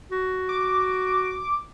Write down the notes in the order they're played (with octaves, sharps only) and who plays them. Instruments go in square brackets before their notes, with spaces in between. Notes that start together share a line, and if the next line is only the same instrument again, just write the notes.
[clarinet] F#4
[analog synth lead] D6